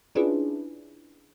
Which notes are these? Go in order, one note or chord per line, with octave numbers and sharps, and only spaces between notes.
C#4 D4 E4 F4 G#4 B4